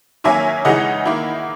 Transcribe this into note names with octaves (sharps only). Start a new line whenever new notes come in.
D#3 F#3 A#3 C#4 E5 G#5
C#3 E3 G#3 D#4 D#5 F#5
D#3 A#3 E4